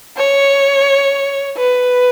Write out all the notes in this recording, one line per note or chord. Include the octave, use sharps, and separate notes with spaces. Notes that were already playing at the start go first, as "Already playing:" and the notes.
C#5
B4